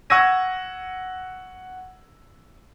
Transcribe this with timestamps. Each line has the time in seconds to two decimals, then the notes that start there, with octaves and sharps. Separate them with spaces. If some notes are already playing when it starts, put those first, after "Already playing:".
0.10 F#5 C#6 E6 G#6 A#6 D#7